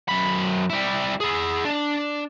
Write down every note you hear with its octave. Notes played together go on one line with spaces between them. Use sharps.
F#2 B5
G3 E4
E4 G#4
D4